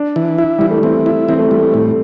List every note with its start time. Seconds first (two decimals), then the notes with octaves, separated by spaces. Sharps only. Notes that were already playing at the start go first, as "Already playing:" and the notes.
Already playing: D4
0.16 E3
0.38 E4
0.58 E3 G3
0.71 A3
0.83 E3 C4
1.06 E4
1.29 E3 C4
1.39 A3
1.48 E3 G3
1.58 A3
1.74 A2